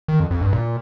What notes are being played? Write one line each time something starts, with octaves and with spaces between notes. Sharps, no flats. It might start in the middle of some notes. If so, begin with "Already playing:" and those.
D#3
F2
F2
G2
A#2